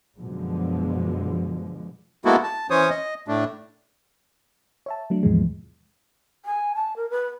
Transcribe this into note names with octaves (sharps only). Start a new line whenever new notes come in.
F#2 B2 D3 F3 G#3
G#3 A#3 B3 E4 F#4 A4
A5
E3 C#4 C5 C#5 D#6
D#5
A2 A3 D4
C#5 E5 A5
F#3 A3 D4
D#2 G#2 B2 E3 F3 G#3
G#5
A5
A#4
B4